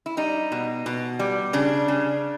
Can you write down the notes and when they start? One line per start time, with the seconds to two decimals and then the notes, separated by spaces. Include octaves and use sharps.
0.06 E4
0.17 G3 D#4
0.52 B2
0.86 B2
1.19 G3
1.53 C#3 D4
1.88 C#3